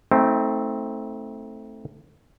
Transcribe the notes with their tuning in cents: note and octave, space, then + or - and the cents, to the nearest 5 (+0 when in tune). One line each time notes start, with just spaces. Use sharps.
A3 +0 C4 +0 D#4 +40